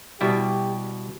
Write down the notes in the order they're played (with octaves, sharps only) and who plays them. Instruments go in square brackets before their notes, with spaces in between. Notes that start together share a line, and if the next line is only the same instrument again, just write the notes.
[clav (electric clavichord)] B2 G3 E4 [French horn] G4